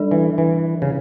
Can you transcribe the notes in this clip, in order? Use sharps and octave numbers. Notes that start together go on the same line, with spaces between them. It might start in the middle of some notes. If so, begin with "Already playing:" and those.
Already playing: G3 D4 A4 D5
E3
E3
C#3